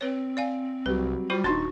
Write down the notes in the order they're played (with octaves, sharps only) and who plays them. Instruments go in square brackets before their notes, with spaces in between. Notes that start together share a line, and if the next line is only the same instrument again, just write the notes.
[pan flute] C4 [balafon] B4 C#5
[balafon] D5 F5 G#5
[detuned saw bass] C2 [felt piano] F#3 G3 [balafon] B4
[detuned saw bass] G3 [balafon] F4 F#4 C5
[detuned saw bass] D#1 [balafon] D4 [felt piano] D#4 C6 A6 [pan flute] F#4